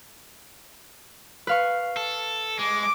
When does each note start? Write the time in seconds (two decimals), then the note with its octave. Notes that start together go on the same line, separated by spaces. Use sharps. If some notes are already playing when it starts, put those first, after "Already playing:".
1.47 B4 F5 C#6
1.97 A4
2.59 G#3 D6